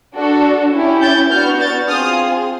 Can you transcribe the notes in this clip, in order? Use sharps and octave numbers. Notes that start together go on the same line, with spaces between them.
D4 F#4 A4
C#4 E4 G4
G6 A6
B3 D4 F#4 F6 G6
G6 A6
C4 F4 G#4 D#6 F6